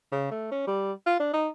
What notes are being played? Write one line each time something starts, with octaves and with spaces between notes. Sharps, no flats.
C#3
A3
C#4
G3
F4
D4
D#4